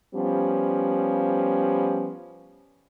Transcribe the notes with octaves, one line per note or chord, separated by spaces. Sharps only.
F3 G3 B3 C#4